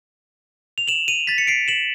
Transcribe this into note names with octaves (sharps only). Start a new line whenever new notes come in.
F7
E7 F#7
D#7 F7
A6 B6
C#7
C7 D7
E7 F#7